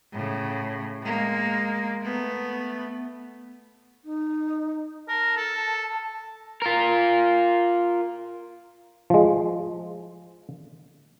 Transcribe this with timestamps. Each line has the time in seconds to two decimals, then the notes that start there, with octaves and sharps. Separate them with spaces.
0.12 A2 C#3
1.02 G#3 A#3
2.01 A3 B3
4.03 D#4
5.08 A#4 A5
5.37 A4
6.62 F4 A#4
9.10 F3 G#3